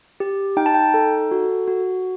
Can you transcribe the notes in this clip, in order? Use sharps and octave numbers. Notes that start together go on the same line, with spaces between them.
G4
D#4 G5
A5
G5
A4
F#4
F#4